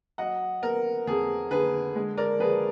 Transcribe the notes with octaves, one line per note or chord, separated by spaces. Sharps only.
F#3 D#5 F#5
B3 A#4
F2 G#4
D3 G#4 B4
G#3
A#4 D5
F3 G#4 B4